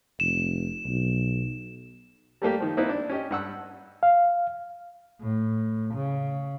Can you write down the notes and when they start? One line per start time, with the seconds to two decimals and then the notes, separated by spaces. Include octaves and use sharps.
0.20 F1 E7
0.85 B1
2.42 G3 A3 A#3 G4
2.60 D#3 F3
2.77 A#3 C4 D#4 E4 B4
2.89 D4
3.10 C#4 G4 D#5
3.31 G2 F#5 E6
4.03 F5
5.21 A2
5.95 C#3